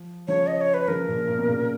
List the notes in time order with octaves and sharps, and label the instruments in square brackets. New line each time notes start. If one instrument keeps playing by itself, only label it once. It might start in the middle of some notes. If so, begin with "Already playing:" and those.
Already playing: [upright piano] F3
[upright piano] C#3 F3 [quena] C#5
[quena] D#5
C#5
B4
[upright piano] C#3 F3 [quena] A#4
[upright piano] A#2 C#3
A#2 C#3
B2
A#2 C#3